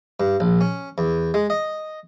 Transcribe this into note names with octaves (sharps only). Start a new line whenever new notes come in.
G2
A#1
C#4
E2
G#3
D#5